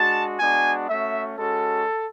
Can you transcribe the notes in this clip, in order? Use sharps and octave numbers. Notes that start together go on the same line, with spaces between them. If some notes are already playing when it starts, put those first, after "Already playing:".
Already playing: G#3 D4 F#4 A5
G#3 B3 D4 F#4 G#5
A3 C#4 F#4 E5
G#3 C#4 F#4 A4